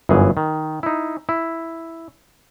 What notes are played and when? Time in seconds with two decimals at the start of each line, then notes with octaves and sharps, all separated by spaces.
0.09 G1 F#2 E3 G#4
0.37 D#3
0.83 D#4 E4
1.29 E4